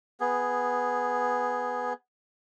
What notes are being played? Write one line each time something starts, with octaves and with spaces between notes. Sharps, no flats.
B3 G#4